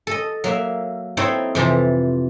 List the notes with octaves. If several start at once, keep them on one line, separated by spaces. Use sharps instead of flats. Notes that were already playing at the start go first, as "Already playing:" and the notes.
A4 D#5
F#3 A#3 E5
C4 D#4 E4 A4 C#5
F2 C3 E3 A5 A#5